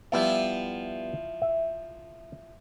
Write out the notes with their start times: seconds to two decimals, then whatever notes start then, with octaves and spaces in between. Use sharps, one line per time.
0.12 F3 G3 B3 E4 F4 E5
1.42 E5